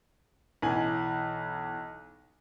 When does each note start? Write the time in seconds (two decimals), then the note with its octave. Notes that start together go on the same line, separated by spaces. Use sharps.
0.62 B1 E3 G#5 F#7